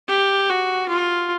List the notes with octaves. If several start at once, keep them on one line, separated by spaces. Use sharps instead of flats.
G4
F#4
F4